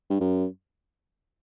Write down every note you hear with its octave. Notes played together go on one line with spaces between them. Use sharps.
G2
F#2